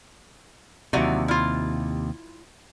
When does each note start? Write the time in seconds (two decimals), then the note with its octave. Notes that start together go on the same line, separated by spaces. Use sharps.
0.93 D#2 C3 E3 F#3 D5
1.28 E4 F4